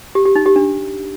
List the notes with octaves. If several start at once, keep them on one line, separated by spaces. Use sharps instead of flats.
G4
G4
D#4
G4
D4